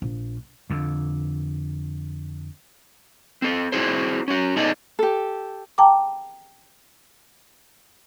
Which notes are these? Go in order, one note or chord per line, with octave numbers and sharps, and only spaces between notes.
A#1
F2 D3
C4 A4
C4 E4 F#4 G#4 C5
C#4 F#4
B3 D#4 G#4 A4 D5 D#5
G4 A4
G5 A5 A#5 D6